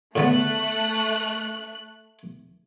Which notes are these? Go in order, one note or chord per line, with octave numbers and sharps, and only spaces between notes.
A2 D3 A3 B3 F#6